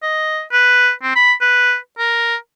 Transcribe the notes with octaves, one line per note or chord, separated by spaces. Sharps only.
D#5
B4
C4
B5
B4
A#4